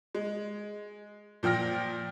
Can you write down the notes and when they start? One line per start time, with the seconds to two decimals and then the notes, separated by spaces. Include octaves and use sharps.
0.15 G#3
1.43 A#2 F3 G5 F6 A#6